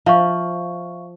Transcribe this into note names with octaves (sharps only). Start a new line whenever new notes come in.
F3 E5 F5 C#6